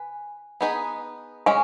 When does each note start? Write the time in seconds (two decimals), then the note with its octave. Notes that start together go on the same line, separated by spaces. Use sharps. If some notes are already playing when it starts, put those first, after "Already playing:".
Already playing: B4 G#5
0.61 B3 D#4 G#4 B4
1.46 G#3 C#4 G#5